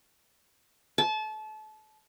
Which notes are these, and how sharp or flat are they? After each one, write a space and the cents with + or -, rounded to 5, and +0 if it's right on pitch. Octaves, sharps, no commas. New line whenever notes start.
A5 -30